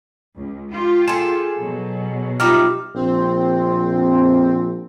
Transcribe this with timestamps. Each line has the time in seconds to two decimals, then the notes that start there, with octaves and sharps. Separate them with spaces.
0.37 C#2
0.72 F4 G4
1.08 G#4 A4 E7
1.60 B2 F#3
2.40 G3 D#4 F4 E5 D6 F6
2.95 A#1 C4